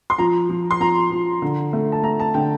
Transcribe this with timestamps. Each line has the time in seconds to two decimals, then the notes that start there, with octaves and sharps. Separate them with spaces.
0.10 C6
0.19 F3 A#5
0.49 F3
0.71 C6
0.80 F3 A#5
1.11 F3
1.42 D3
1.73 A3
1.92 A5
2.03 A3 A#5
2.20 A5
2.34 D3 G5